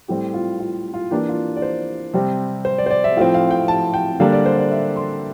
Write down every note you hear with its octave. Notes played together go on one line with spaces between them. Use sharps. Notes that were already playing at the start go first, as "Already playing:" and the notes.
A2 G3 C4 G4
F4
F4
F4
E3 A#3 D4 G4
F4
D5
C5
C3 G3 C4
C5
D5
C5
D5
E5
A2 F3 C4 F5
F5
G5
A5
G5
D3 G3 A#3 D4 F5
D5
C5
D5
E5
C6